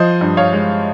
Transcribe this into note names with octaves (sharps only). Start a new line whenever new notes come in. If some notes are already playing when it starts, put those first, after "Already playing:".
Already playing: F3 C5 D#5
G2
C#5 F5
G#3